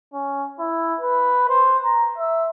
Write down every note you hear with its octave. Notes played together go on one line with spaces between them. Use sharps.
C#4
E4
B4
C5
A#5
E5